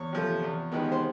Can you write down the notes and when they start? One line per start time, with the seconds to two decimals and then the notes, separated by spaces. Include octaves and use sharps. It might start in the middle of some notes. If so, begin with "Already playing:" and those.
Already playing: E2 C#5
0.13 C3 F3 A3
0.43 E2
0.72 C3 D#3 G#3 B3
0.92 C5